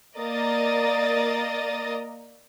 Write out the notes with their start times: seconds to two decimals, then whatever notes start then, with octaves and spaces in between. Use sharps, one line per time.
0.18 A#3 D5 D#5 A#5 D#6 A6